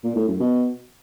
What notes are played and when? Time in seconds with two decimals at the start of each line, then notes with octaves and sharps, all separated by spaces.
0.04 A#2
0.16 A2
0.28 F#2
0.40 B2